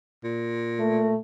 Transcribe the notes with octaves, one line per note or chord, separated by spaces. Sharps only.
A#2
A3